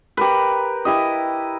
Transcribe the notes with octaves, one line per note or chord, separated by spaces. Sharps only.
G4 A#4 B4
E4 G4 D#5